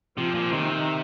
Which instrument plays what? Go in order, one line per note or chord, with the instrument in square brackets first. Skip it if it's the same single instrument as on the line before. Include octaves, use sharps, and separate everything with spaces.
[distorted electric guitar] C3 [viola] F3
[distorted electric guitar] A#2
[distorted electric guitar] C3 [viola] D#3